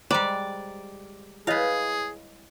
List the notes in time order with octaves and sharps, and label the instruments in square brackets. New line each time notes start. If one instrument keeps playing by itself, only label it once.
[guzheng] G3 G#3 [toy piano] C5 A#5 [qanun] D5
[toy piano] E4 C#5 D#5 [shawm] G#4 [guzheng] B4 F5